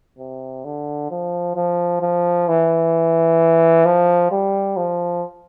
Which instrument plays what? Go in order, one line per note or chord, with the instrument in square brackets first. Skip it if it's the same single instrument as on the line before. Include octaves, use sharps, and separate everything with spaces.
[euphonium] C3
D3
F3
F3
F3
E3
F3
G3
F3